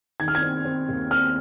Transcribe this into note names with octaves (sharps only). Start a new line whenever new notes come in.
D#3 G#6
F6
G#6
C4
C4
D#2
C4 F6